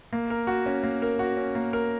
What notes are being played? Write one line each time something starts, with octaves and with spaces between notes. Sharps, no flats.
A#3
A#4
F#4
C#4
A#3
A#4
F#4
C#4
A#3
A#4